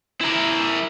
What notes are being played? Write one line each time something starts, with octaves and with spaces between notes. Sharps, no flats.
E4 A#4